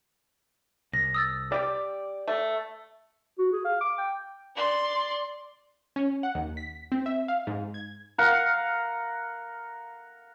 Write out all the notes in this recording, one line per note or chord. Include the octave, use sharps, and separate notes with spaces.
C2 A#6
D#6 E6 A6
G3 G4 D5
A3
F#4
G#4
F5
D6
G5
D5 C6
C#4
F#5
D#2
B6
C4
E5
F5
G#2
G#6
A#4 F5 F#5